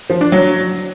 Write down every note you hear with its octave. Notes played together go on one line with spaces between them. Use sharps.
F3
D4
F#3